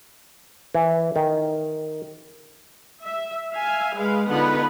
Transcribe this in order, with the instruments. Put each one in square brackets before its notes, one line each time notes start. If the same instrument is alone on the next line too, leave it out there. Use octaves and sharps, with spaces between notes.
[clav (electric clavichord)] E3
D#3
[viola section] E5
E5 F5 G#5
G#3 B4 F5
D3 B3 D#4 F4 B4 F#5